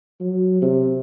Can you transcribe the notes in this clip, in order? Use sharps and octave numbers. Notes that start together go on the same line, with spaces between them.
F#3
C3